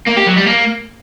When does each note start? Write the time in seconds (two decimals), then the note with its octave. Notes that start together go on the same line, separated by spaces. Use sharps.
0.06 A#3
0.16 G4
0.26 F#3
0.36 G3
0.46 A#3